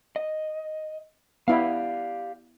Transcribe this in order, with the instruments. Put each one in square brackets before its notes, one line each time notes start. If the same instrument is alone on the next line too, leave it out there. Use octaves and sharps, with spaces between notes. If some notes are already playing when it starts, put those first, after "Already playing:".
[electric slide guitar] D#5
[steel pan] B3 E4 [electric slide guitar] G4 D5 F5